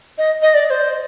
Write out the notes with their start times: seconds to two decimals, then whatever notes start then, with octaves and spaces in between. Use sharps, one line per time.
0.18 D#5
0.42 D#5
0.54 D5
0.66 D5
0.70 C5
0.92 C5